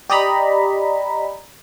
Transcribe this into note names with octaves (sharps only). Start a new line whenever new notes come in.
G4 D5 D#5 A#5 B5